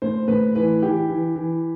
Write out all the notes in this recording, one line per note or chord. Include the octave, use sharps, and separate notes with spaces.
A2 C5
A2 B4
E3 B4
E3 G4
E3
E3